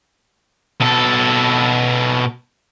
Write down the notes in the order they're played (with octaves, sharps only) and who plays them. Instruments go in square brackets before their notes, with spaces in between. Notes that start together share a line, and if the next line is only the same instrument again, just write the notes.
[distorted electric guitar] B2 A4